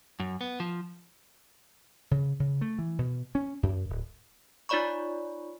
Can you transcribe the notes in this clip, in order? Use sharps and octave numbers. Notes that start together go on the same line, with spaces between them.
F#2
B3
F3
C#3
C#3
A3
E3
B2
C#4
F#2
D1
D#4 F4 C#5 D5 B5 C#6